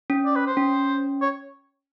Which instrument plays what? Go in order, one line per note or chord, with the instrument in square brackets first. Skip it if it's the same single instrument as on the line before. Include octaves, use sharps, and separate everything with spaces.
[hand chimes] C#4
[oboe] D5
B4
C5
[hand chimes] C#4
[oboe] C#5